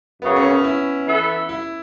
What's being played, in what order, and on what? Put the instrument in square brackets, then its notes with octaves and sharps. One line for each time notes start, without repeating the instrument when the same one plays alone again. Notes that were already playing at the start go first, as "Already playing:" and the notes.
[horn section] F#2 C#3 F#3 [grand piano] B3
[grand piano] C#4
C#4
E4
[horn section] E3 B3 A4 E5
[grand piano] E4